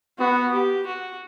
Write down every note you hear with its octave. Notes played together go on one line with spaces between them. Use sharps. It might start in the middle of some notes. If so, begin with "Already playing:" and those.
B3 F#4
G4
F#4